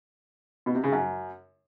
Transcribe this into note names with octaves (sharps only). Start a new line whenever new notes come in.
B2
C3
C#3
F#2